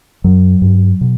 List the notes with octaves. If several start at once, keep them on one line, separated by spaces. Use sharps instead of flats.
F#2 F#3
G2
B2